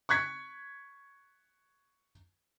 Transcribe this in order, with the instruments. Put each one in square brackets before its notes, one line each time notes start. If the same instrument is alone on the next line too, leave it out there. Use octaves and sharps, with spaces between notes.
[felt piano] C#6 F#6 G#6 B6 C#7